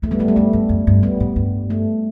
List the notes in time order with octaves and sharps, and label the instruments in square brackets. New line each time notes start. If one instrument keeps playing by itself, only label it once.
[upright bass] E2 [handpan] A3
[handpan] G3 B3
[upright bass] F#2 [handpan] A3
[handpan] G3
[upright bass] G2 [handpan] A3
[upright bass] F#2
F#2
G2
[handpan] G3 B3
[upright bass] A2
G2
[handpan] A3